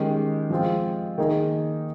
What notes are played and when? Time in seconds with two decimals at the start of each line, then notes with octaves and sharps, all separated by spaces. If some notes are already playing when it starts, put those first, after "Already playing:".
Already playing: D#3 G#3 C#4 G4
0.50 F3 G#3 C4 F4
1.18 D#3 A#3 D#4 G#4